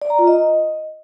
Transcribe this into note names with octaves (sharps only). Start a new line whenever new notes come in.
D5
A#5
F4
D#5